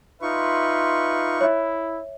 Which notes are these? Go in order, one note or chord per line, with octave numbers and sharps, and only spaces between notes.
D#4 F4 B4 E5 C6 C#6
E4 C#5 E5